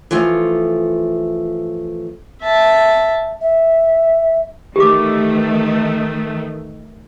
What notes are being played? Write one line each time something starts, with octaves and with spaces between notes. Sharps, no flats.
E3 F3 A3 F4
E5 A5
E5
D#3 E3 A3 G4 D6